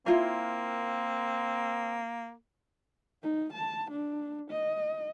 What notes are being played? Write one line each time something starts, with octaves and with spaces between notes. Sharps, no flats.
A#3 C4 E4 F4 A#4
D#4
A5
D4
D#5